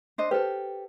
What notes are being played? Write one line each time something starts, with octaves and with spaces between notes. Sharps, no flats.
D4 C5 D#5
G4 A4 B4 C5